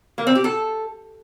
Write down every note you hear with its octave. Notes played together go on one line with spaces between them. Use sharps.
A#3
C4
G4
A4